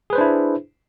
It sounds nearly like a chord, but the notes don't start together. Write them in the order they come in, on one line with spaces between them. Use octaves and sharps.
G#4 B4 C5 D4 E4